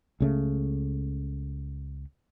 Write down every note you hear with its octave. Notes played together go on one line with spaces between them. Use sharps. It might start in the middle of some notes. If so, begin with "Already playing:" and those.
C#2 C#3 A3